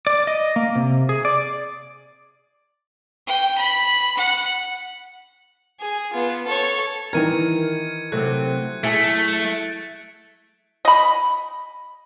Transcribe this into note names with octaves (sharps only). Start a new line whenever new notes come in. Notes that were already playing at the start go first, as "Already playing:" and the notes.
D5
D#5
A#3
C3
G#4
D5
G5
B5
F#5
G#4
B3 F4
A4 C#5
D#3 E3 A#4 G#6 C#7 D#7
C3 F#3 A3 F#6
F#3 A3 E4 G#4 A6 C#7 D7
D#5 B5